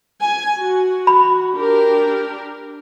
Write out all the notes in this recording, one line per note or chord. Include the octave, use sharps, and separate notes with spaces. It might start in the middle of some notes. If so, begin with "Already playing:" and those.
G#5
F#4
B5
D4 G4 A#4